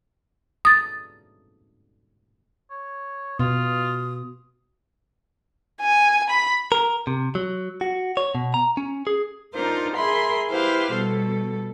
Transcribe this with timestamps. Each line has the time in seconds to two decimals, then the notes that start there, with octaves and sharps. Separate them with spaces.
0.65 D#6 A6
2.71 C#5
3.39 B2 F4 D#6
5.81 G#5
6.30 B5
6.72 A#4
7.07 C3
7.35 F#3
7.81 F#4
8.17 C#5
8.35 B2
8.54 A#5
8.77 C#4
9.07 G#4
9.54 D4 D#4 F4 A#4 C5
9.95 G#4 A#4 E5 B5 C6
10.50 E4 G4 B4 C5 F5
10.93 B2 G3 A4